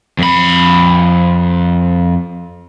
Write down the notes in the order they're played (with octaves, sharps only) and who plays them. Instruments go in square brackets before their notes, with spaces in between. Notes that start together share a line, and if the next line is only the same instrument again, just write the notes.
[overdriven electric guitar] F2 B5